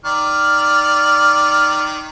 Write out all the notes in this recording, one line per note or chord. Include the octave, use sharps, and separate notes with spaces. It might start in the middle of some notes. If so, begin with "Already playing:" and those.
D#3 D5 F6